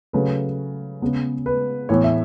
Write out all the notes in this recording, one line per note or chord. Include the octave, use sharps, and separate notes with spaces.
C#3 F#3 A3 B4
C#3 G#3 B3
B4
A2 E3 B3 C#5
E5